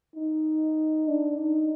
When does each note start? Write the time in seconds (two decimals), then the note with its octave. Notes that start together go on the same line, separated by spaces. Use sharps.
0.15 D#4
1.08 D4
1.38 D#4